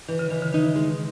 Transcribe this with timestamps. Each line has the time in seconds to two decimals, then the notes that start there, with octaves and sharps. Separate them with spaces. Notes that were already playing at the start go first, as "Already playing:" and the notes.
0.08 D#3 E3
0.19 C#3
0.31 D#3 E3
0.42 C#3
0.53 D#3 D#4
0.76 G#3